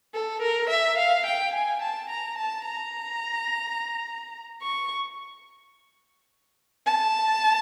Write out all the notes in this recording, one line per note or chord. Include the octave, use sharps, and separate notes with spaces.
A4
A#4
E5
F5
G5
G#5
A5
A#5
A5
A#5
C#6
A5